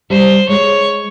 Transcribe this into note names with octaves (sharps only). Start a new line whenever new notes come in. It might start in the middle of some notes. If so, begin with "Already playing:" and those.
G3 C5
G#3 C#5